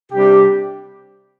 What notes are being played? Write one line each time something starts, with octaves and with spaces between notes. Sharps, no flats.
C3 G3 D4 G4